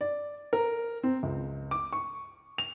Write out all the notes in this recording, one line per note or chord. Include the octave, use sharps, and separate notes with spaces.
D5
A#4
C4
C#2
D6
C#6
F7